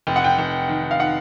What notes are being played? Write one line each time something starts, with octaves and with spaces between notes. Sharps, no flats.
F1 G5
F#5
G5
F1
D#3
F5
D#3 F#5